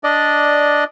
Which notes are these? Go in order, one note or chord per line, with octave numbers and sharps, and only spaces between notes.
D4 D5 D#5